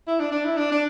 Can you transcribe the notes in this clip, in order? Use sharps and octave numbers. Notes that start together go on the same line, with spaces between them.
E4
D4
D4
E4
D4
D4